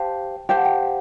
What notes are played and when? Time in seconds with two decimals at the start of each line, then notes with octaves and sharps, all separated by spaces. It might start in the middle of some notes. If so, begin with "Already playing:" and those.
Already playing: G4 C5 F5 G5 A5
0.49 G4 C5 F5 G5 A5
0.57 F#5
0.65 G5